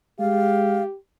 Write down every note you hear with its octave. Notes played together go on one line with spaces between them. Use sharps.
G#3 G4 F5